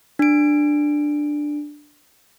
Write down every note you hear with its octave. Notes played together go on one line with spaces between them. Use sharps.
D4 D7